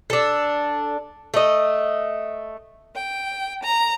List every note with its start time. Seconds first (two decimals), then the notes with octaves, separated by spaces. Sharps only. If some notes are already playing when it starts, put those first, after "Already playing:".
0.10 D4 A4
1.34 A3 D#5
2.96 G5
3.63 A#5